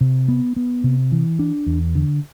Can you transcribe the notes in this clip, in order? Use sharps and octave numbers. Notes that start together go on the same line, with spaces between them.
C3
B3
B3
C3
E3
D4
E2
D3